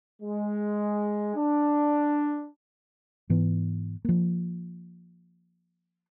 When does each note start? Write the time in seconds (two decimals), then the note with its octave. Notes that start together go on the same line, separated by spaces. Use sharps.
0.23 G#3
1.35 D4
3.29 G#2 E3 B3
4.05 F3 A#3